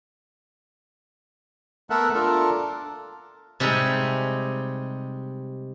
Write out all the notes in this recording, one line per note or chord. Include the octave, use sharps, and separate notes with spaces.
A3 B3 A4 A#4 E5 F#5
D4 F4 A4 A#4
C3 G3 G#3 D#4 G#4